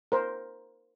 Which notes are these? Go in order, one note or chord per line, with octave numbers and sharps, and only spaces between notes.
A#4 C5